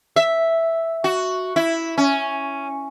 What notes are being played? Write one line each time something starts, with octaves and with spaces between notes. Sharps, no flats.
E5
F#4
E4
C#4